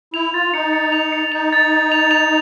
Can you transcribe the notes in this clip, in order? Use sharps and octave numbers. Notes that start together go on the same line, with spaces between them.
E4 F7
F4 A6
D#4 C#7
C#7
F7
C#7
D#4 F7
A6
A6
F7
F7